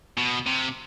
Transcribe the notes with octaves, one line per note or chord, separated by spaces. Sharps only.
B2
C3